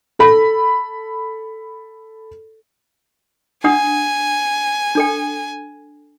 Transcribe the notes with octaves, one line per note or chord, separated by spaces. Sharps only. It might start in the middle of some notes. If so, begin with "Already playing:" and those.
A4 B5
D4 F#5 G#5 D#6
D4 A4 G5